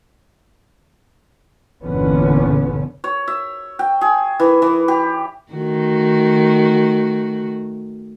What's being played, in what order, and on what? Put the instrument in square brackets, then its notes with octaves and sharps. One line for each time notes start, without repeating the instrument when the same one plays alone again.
[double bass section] G1 E2 A#2 D3 B3 C#4
[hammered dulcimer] C#5
E5
G5
G#4
E3
E3
G4
[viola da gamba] D#3 A3 F#4